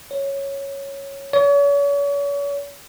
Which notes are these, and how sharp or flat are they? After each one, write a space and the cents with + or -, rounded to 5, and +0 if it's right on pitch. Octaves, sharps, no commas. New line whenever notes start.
C#5 -5
C#5 +40